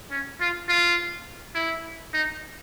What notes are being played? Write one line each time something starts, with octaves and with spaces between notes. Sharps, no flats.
C#4
F4
F4
E4
D#4